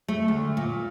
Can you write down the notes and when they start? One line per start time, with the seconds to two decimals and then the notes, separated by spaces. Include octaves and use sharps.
0.08 A3
0.28 D2
0.57 A#2